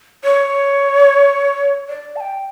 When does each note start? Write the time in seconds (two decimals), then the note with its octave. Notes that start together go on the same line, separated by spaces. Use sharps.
0.24 C#5
1.89 D5
2.16 A5
2.20 G5